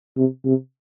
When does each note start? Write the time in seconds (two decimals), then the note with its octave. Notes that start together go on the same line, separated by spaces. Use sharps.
0.17 C3
0.45 C3